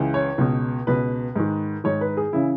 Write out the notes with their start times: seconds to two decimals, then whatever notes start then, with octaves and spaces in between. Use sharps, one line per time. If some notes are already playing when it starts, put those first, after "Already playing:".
Already playing: C#2 C#3 E3
0.14 C#5
0.38 C#2 B2
0.87 C#2 B2 B4
1.36 G#2 D#3
1.84 G#2 D#3 C#5
2.01 B4
2.17 G#4
2.33 C#3 E3 E4